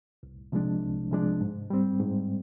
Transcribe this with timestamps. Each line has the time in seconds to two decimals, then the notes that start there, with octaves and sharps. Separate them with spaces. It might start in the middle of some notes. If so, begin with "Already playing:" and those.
0.23 C2
0.52 C3 F3 G#3 D4
0.82 C2
1.11 C3 F3 G#3 D4
1.41 G#2
1.70 G3 C4
2.00 G#2